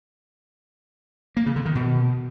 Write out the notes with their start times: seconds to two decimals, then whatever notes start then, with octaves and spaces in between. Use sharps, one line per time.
1.37 A#3
1.46 C#3
1.56 D3
1.66 D#3
1.75 B2